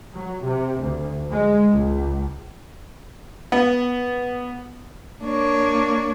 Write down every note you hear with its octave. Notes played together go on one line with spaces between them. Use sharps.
F#3
C3
D2
G#3
C#2
B3
A#3 D4 C#5